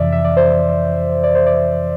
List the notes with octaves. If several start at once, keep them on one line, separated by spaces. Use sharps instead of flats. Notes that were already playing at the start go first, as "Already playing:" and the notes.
Already playing: F2 C3 E3 D5 E5
E5
D5
C5
D5
C5
D5